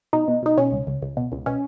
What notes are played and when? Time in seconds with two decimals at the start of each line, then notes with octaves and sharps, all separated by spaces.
0.13 B2 D#4
0.28 B2
0.43 B2 D#4
0.57 B2 C#4
0.72 C#2
0.87 C#2
1.02 C#2
1.17 B2
1.32 C#2
1.46 B2 C#4